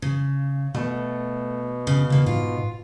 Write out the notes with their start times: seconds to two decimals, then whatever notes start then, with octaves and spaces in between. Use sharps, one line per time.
0.02 C#3
0.74 B2 A3
1.87 C#3
2.10 E2 C#3 A#3
2.26 G#2 F4